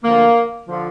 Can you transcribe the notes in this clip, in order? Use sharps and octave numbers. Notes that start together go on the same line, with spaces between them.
D2 D3 F3 A#3
D3 F3